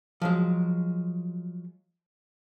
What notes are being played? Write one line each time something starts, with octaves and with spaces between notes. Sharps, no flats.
F3 F#3 G#3